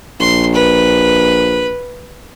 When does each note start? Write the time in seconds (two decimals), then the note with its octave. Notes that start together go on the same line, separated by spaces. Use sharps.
0.20 A#1 C6
0.55 B4